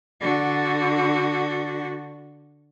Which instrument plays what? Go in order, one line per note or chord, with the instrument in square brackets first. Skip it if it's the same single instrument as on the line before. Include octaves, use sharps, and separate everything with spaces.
[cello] D3 F#4